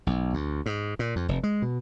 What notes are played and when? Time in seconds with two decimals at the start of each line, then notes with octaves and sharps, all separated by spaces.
0.07 B1
0.34 D2
0.66 G#2
0.99 A#2
1.16 F2
1.29 F1
1.44 G#3
1.62 B2